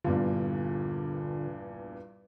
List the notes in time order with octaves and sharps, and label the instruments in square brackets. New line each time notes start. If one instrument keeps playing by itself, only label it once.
[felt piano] A#1 E2 G2 [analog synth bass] D3 [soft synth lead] F4